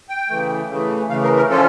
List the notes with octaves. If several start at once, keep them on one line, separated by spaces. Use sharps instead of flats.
G5
C#3 E3 A3
C#3 E3 A3
C#3 E3 A3 F5
A#4
A#4
D3 F3 C#4 F4 A4